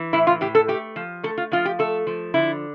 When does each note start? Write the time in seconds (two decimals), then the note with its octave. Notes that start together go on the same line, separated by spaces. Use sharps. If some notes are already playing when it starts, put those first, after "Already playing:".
Already playing: E3
0.13 A2 E4
0.27 F4
0.41 A2 G4
0.55 A4
0.68 A3 G4
0.96 F3
1.23 A3 A4
1.38 F4
1.52 F3 F4
1.65 G4
1.79 A3 A4
2.07 F3
2.34 D3 E4